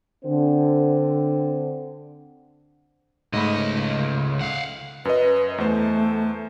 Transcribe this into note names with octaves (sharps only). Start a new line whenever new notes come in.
D3 C4 C5
C#2 G#2 A3 D#5 B5
F5 F#5
F#2 B4 D#5
E2 A3 C5